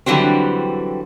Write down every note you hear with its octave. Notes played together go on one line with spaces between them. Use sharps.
D3 E3 F#3 G3 C4